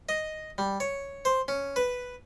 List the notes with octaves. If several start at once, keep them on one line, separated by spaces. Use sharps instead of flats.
D#5
G3
C#5
C5
C#4
B4